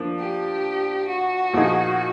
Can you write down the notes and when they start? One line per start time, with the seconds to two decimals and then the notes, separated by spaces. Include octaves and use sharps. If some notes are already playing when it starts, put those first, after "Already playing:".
Already playing: F3 A#3 D4
0.19 G4
1.09 F#4
1.53 A#2 F3 A#3 D#4 G#4